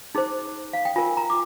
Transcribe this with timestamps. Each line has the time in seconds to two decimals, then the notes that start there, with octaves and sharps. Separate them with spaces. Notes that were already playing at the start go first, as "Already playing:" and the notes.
0.15 D#4 G#4 C5
0.73 F5
0.85 G5
0.96 F4 A#4 G#5
1.17 A#5
1.30 D6